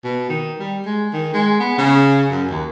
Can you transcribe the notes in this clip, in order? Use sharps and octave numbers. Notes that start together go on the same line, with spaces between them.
B2
D#3
G3
G#3
D#3
G#3
B3
C#3
F#2
D#2